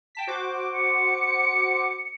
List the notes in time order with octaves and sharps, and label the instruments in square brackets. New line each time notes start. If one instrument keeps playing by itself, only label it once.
[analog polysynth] G5 A5 B6
F#4 C5 D6
[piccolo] C#7